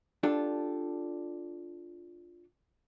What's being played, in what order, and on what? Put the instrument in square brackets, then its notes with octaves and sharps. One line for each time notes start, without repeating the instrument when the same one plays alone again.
[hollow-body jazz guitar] D4 F4 G4 A4